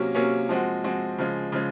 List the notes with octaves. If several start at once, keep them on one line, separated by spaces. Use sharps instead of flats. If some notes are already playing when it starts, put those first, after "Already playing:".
Already playing: C3 F#3 A#3 C#4
C3 F#3 A#3 C#4
F3 G#3 C4 F#4
F3 G#3 C4 F#4
C#3 F3 G#3
C#3 F3 G#3